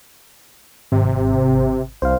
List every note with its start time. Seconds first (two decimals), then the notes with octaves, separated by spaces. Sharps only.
0.92 G#1 C3
2.02 C2 C5 F5